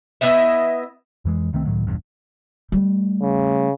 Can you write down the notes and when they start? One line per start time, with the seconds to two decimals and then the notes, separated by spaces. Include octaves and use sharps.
0.21 B3 E4 D#5 E5
1.25 F2 E3 G#3
1.53 C2 D#3 A3 C4
1.65 C#2 A2 D#3 F#3
1.87 F1 A#1 E2 G2
2.72 G3 A3
3.22 C#3